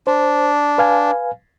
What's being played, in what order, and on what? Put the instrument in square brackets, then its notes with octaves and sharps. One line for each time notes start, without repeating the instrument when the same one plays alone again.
[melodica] D4 [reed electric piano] C5
[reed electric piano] B4 F5 G#5